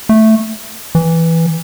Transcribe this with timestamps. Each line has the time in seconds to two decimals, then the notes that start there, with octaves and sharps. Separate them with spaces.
0.09 A3
0.95 E3